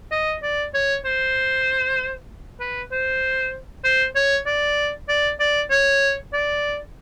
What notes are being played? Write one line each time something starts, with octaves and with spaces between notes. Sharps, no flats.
D#5
D5
C#5
C5
B4
C5
C5
C#5
D5
D5
D5
C#5
D5